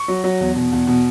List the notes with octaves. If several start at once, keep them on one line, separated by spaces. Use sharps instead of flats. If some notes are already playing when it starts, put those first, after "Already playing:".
Already playing: C#6
F#3
F#3
E2
B2
E2
B2